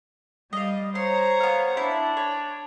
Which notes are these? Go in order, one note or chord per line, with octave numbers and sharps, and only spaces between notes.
G3 D#5 F5
C5 C#5 A#5 C6
B3 F5
D4 E4
C#5